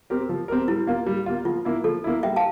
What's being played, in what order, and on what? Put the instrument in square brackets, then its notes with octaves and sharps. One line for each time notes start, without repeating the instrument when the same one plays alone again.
[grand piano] C4 G4 A#4
F3
C4 G4 A#4
[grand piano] G3 [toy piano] E4
[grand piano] A#3 F4
G3
A#3 F4
[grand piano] F3 [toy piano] F4
[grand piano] A#3 E4
[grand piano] F3 [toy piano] A4
[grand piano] A#3 E4
[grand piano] G3 [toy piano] E5 G5
[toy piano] F5 A5